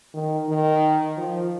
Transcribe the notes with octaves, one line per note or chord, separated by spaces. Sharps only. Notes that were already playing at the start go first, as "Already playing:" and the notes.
D#3
D#3
F3